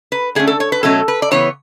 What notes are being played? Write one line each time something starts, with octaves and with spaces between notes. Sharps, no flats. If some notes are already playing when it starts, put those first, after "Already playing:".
B4
D3 A3 C#4 G#4
A4
C#5
B4
B2 F#3 A3 C#4 A4
B4
D5
C#3 E3 B3 C#5